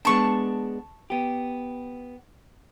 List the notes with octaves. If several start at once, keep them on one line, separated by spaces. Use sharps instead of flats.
G#3 B3 D4 A5 C#6
B3 G4